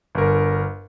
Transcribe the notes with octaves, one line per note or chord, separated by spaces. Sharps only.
G1 A#4